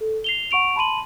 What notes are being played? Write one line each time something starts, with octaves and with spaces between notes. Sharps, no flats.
A4
C7 F7 G7
F#5 C#6 D7 F7
A5 B5 C6 D#7 F#7